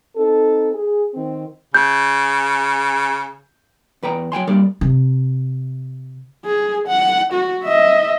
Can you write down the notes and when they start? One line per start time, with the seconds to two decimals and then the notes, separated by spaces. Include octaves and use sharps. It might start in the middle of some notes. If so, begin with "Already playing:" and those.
0.16 C4 D#4 A4
0.74 G#4
1.14 D#3 C4
1.74 C#3 G6
4.03 E2 B4 G5 A#5
4.32 F#3 G5 G#5 C6
4.47 G2 G3 A#3 D4 A#4 D5
4.81 C3
6.45 G#4
6.88 F#5
7.33 F#4
7.64 D#5 E5